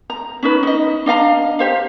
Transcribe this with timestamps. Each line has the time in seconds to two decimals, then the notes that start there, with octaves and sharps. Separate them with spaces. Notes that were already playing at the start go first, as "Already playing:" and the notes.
0.10 A#5
0.43 C#4 D#4 B4
0.63 D#4 D#5
1.06 D4 D#5 F5 A#5
1.59 G4 C5 F5